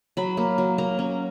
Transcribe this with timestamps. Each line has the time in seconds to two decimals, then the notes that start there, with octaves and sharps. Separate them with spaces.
0.17 F#3 B5
0.37 A#3
0.58 F#3
0.78 A#3 A#5
0.99 C#4